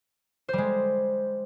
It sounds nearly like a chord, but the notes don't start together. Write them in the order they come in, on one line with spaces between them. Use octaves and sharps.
C5 G3 G#3